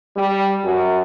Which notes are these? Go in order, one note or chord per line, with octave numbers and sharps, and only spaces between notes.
G3
F#2